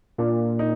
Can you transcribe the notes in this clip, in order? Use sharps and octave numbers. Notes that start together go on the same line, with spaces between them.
A#2 D4
D#4